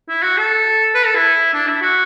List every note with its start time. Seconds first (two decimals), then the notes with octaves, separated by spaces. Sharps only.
0.09 E4
0.23 F#4
0.37 A4
0.95 B4
1.06 A4
1.15 E4
1.54 D4
1.68 E4
1.82 F#4